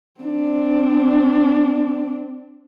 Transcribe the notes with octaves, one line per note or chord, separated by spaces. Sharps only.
C4 D4